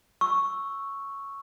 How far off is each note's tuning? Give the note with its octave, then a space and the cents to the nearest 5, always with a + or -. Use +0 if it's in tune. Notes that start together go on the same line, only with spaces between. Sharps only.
C#6 +0 E6 +0